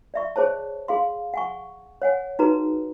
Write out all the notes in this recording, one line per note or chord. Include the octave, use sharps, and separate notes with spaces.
D5 E5 C#6
G#4 C5 C#5 A5
G#4 F5 C6
F#5 G#5 C#6
C#5 F#5 G#5
D#4 F#4 G#4 B4 A#5